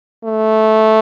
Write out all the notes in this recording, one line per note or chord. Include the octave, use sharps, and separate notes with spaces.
A3